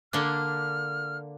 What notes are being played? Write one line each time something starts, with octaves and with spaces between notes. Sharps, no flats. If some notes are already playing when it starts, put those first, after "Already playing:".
D3 A#3 D4 F6